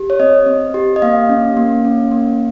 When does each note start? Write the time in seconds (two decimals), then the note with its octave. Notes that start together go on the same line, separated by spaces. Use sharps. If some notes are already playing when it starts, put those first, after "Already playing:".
Already playing: G4
0.10 C#5
0.20 C4 D#5
0.46 C4
0.74 G4
0.96 D#5
1.02 A#3 F5
1.29 C#4
1.57 A#3
1.85 C#4
2.11 A#3